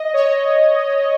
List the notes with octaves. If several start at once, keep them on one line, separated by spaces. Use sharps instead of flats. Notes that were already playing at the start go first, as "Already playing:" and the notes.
Already playing: D#5
C#5